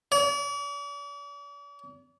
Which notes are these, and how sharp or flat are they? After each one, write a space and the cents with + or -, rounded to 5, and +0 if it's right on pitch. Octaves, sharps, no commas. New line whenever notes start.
D5 -45